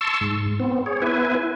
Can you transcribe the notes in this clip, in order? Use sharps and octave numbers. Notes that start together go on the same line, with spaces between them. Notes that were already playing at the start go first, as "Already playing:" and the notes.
A5 C6 C#6 E6
G#2
B3 C4
G#4 C#5
B3 E4 B4 G#5